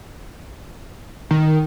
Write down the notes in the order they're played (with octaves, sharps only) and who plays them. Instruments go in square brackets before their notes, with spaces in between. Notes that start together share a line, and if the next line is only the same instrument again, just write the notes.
[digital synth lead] D#3